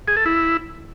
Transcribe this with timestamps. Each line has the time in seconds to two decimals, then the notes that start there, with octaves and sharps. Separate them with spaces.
0.08 G#4
0.17 A4
0.26 E4